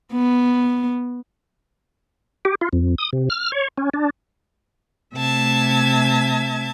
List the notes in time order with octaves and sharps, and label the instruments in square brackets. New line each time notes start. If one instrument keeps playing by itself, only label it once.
[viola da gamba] B3
[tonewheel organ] G4
F4
F2
D#6
C3
F6
C#5
C#4
D4
[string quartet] C3 A3 E5 A5 G#6